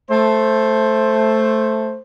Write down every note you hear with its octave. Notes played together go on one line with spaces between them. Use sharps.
A3 C5